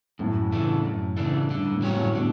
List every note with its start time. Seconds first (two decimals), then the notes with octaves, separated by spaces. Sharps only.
0.19 F#2 A2
0.52 C#3 E3 A3 D4
0.85 F#2
1.17 C#3 E3 A3 D4
1.50 G2 D3
1.71 A2
1.82 F#3 C#4 G4 C#5
1.93 A2
2.15 B2 D3